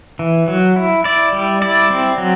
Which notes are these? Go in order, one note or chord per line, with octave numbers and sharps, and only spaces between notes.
E3
F#3
E4
E4 D5
G3
E4 D5
C4
F#3